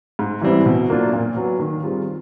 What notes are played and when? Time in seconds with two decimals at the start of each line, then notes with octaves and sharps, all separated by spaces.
0.19 G#2
0.41 E3 G3 C4 E4
0.66 B2
0.89 F#3 A#3 D4 F4
1.13 A#2
1.36 F#3 B3
1.60 D#3
1.83 G3 C4 F4 G#4